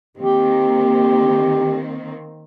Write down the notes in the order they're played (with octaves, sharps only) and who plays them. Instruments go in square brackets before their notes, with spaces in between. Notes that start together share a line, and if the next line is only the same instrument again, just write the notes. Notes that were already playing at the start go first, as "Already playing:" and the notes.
[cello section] D#3 A#3 C4 [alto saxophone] G4